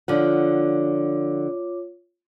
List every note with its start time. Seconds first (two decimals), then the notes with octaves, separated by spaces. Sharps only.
0.08 D3 F3 F4 C#5 F#5 D6